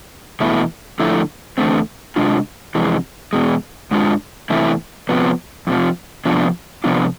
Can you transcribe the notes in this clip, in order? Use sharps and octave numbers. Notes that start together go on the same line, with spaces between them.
E2 B2 A3 E4
D3 F3 A3 E4
E2 D3 F3 A3 C4
C3 G#3 D4 F4
F2 C3 E3 G#3
E2 B2 G#3
G#2 G#3 D4 F4
E2 C3 E3 A3 E4
C3 F3 B3
F2 C3 F3
C3 F3 B3 D4 F4
C3 F3 B3 D4 F4